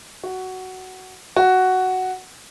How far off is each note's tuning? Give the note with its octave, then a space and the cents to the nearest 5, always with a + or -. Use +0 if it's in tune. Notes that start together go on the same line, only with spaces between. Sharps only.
F#4 +10
F#4 +5